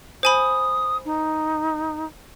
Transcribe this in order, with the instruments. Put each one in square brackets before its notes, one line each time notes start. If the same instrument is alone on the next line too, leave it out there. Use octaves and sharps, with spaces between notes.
[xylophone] C5 G#5 B5 [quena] D#6
[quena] D#4